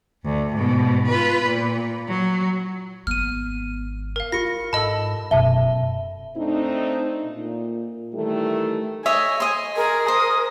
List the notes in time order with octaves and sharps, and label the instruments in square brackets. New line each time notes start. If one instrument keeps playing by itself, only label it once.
[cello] D2
G#2 B2
F4 B4
A#2
F#3
[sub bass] G#1 [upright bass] B3 [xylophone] F6 D#7
[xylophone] A#4 F5
[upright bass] E4 [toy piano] F4 G4 [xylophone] A#6 C#7
[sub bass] G#2 [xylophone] A4 D#5 A5 [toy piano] B5 E6
[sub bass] D#1 [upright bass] F#2 B2 [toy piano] E5 A5 [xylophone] G7
[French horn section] A3 C4 D4 D#4
A#2
D#3 E3 G3 A3
[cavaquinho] C#5 D#5 E5 [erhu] G#5
[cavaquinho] D#5 C6
[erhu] G#4 [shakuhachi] A#4
[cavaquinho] C5 [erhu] D#6